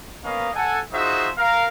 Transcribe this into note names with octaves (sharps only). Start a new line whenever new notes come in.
A#3 B3 C#4 A#4 D#5 F5
A4 F#5 G#5
D#4 F4 F#4 G#4 C5 E5
A#4 F5